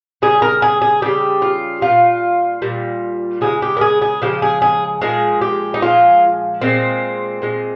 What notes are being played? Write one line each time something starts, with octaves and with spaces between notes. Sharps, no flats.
C#3 G3 G#4
A#4
G#4
G#4
C#3 G3 G4
F4
A#2 G3 F4
A#2 G3
C#3 F3 G#4
G#3
G4
A#4
G#4
G#4
C#3 F3 G#3 G4
G#4
G#4
A#2 F3 G#3 G#4
G4
D#4
A#2 F3 G#3 F4
A#2 G#3 C4
A#2 G#3